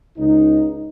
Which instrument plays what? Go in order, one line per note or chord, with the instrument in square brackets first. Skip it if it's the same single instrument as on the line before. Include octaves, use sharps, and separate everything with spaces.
[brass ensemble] C#2 D#4